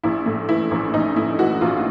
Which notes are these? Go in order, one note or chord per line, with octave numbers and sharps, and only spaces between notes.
A#1 E4
A2
E3 E4
A#1
A#1 D#4
A2 E4
E3 F#4
A#1 F4